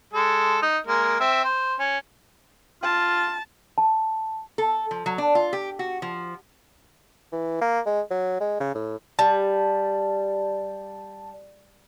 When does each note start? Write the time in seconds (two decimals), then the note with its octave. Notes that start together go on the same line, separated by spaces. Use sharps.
0.13 G#3 A4
0.62 D#4
0.87 G#3 A#3 A#4
1.20 C4 E5
1.44 C5
1.79 C#4
2.83 F4 A5
3.78 A5
4.58 A4
4.91 F3
5.06 F#3
5.18 D4
5.35 F4
5.53 G4
5.79 F#4
6.02 F3
7.32 E3
7.61 A#3
7.86 G#3
8.10 F#3
8.40 G#3
8.60 C#3
8.75 A2
9.19 G3 A5